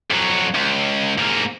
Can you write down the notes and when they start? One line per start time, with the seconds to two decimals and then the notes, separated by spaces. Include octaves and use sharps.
0.11 F2 F#3
0.54 C#2
1.18 G#2 A#3